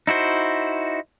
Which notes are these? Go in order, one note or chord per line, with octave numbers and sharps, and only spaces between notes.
D#4 E4 F#4 C5